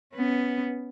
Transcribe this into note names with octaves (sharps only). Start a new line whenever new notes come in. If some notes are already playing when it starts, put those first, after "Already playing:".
B3 C#4